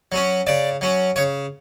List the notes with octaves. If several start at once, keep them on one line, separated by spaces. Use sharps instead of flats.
F#3 C#4
C#3 D5
F#3 C#4
C#3 C#5